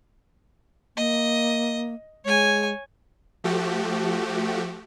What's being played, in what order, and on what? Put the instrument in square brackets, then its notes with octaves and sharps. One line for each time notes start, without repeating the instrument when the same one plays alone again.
[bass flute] A#3 [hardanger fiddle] D#5
[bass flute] G#3 [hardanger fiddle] C#5 G#5
[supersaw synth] F3 A3 F#4 G4